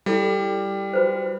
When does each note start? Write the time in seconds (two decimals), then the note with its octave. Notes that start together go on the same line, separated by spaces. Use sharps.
0.06 G3 E4 A4 D5
0.93 F#4 B4 C5